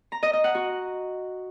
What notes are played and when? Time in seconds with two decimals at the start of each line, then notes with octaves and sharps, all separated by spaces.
0.12 A#5
0.23 D#5
0.33 D#5
0.44 F#5
0.55 F#4